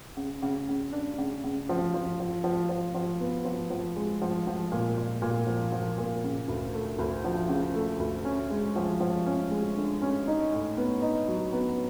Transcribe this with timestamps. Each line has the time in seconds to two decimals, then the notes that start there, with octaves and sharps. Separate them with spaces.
0.17 C#3
0.42 C#3
0.68 C#3
0.93 D4
1.18 C#3
1.44 C#3
1.69 F3
1.94 F3
2.20 F3
2.44 F3
2.69 F3
2.94 F3
3.20 B3
3.45 F3
3.70 F3
3.96 G#3
4.21 F3
4.47 F3
4.72 A#2
4.97 A#2
5.22 A#2
5.47 F3
5.72 F3
5.98 A#2
6.24 C#3
6.48 D2
6.73 A3
6.99 D2
7.24 F3
7.48 C#3
7.74 A3
7.99 D2
8.25 C#4
8.50 G#3
8.76 F3
9.00 F3
9.26 C#4
9.51 G#3
9.77 D3
10.02 C#4
10.27 D#4
10.53 A2
10.77 B3
11.02 D#4
11.27 F#3
11.52 B3